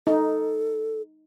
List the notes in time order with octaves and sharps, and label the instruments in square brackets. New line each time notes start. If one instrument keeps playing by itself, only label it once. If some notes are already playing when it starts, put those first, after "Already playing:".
[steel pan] D#4 [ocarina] A4